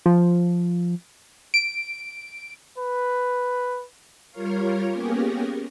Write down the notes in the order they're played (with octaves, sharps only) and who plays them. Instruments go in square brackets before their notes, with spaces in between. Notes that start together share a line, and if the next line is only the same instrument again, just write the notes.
[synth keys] F3
D7
[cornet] B4
[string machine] G3 F4 A#4 C#5 F5
A#3 B3 C#4 G4 G#4 A#4